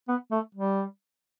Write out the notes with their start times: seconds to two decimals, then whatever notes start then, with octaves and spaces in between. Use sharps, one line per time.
0.08 B3
0.31 A3
0.55 G3